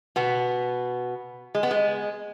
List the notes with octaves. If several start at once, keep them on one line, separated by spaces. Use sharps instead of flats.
B2 B3
G#3
B3
G#3